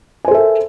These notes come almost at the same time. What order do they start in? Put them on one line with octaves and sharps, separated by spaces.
G#5 C5 A4 E5 A#4